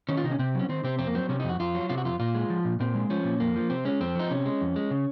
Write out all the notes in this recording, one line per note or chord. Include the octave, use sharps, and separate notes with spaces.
D#3 C#4
F4
C3 D#4
C#4
C3 C4
F#3 C#4
D#3 C4
C3 C4
F2 C4
A#3
F#3 C4
C3 C#4
D#4
F2 F#4
F2 F4
F#3
C3 F4
F#4
F2 F4
A#2 F4
G#3
F3
A#2
A#2 C4
G#3
F3 C#4
A#2
F2 A#3
F3
C3 C4
G#3 C#4
F2 C4
F3 D#4
C3 C#4
G#3
F2
G#3
C#3